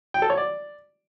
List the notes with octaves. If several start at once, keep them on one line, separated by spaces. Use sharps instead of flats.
G5
A4
C#5
D5